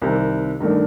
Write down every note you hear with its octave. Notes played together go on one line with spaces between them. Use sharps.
C2 C3 D#3
G2 D#3 A3 D4